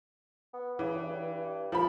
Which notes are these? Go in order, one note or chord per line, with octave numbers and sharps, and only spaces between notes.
B3
C#3 E3
G2
C2 F3 B5